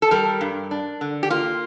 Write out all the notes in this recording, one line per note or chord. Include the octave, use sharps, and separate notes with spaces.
A4
G3 A#4
G2
D4
D3
G4
A#3 F4